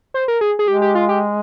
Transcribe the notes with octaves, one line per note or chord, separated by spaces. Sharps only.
C5
A#4
G#4
G#4
G#3 G4
G4
F4
G4